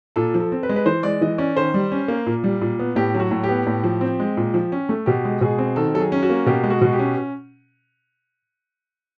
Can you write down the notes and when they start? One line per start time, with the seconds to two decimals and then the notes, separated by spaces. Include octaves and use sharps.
0.16 A#2 A4
0.34 F3
0.40 A4
0.52 C4
0.63 B4
0.69 G#3
0.76 B4
0.86 E3 C5
1.03 G#3 D5
1.21 E3 D#5
1.38 C#4 D5
1.57 D#3 C5
1.74 G3
1.92 C#4
2.08 A#3
2.26 A#2
2.44 G3
2.61 A#2
2.79 B3
2.96 A2 G4
3.15 F#3
3.20 F#4
3.31 A2
3.44 G4
3.49 B3
3.66 A2
3.84 F3
4.01 C4
4.20 G#3
4.37 A#2
4.54 F3
4.72 C#4
4.89 A3
5.06 B2 G4
5.25 G#3
5.41 B2 G#4
5.59 C4
5.76 D#3 A4
5.94 F#3 A4
6.00 G#4
6.12 C#4
6.23 F#4
6.30 A#3
6.46 B2 G4
6.64 G#3
6.70 F#4
6.81 B2
6.93 G4
6.99 C#4